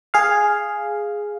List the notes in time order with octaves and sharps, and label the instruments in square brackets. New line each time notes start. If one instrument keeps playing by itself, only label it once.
[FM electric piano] G#4 F5